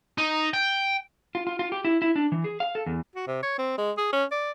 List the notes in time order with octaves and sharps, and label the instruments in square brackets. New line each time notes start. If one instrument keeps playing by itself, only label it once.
[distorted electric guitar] D#4
G5
[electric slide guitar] F4
F4
F4
G4
E4
E4
D4
E3
G#4
F5
A4
E2
[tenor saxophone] F#4
C3
C#5
C4
G#3
G#4
C#4
D5